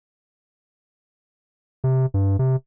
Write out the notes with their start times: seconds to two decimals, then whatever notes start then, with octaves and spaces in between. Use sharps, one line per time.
1.84 C3
2.14 G2
2.39 C3